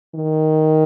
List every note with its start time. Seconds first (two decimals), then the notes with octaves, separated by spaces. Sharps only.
0.15 D#3